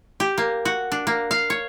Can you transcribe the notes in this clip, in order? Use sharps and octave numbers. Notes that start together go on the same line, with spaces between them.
G4
A#3
F#4
D4
A#3
F5
C#5